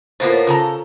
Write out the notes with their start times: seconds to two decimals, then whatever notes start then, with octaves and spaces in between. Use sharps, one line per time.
0.20 A2 A#3 B3 F4 A#4 C5
0.32 C#5
0.47 C#3 F4 A4 A#5